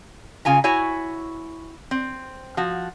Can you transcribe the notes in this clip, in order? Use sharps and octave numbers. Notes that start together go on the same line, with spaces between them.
C#3 F4 G#5 A#5
E4 F#4 C#5 G#5
C4
F3 F#4